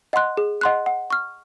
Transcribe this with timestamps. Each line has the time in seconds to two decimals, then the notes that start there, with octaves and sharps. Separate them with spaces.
0.13 D#5 F#5 C6 F#6
0.37 G#4
0.61 D#5 F#5 C6 F#6
0.86 F#5
1.10 C#6 F6